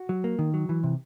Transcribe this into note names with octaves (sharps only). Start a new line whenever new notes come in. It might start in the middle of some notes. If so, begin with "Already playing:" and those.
Already playing: F#4
F#3
A#3
D#3
F#3
E3
C3